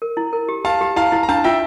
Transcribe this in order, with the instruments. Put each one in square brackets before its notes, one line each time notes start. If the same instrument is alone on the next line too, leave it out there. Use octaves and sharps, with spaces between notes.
[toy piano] A#4
E4
A#4
G4
[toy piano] G4 [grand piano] F5 A5
[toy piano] G4
[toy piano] E4 [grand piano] F5 A5
[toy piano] E4
[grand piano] A#5
[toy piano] D4 [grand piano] F5 A5
[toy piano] F4 [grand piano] E5 G5